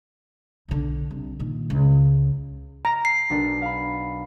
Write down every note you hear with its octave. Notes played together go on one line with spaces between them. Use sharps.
B1 D3
C2
A#2 D#3
C#2
A#5
C7
B1 D4 A#4
F5 B5